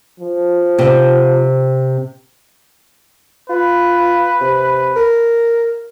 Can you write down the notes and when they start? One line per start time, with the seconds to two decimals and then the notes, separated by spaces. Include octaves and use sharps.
0.20 F3
0.79 C3 C4
3.50 F4 B4
4.41 C3
4.96 A#4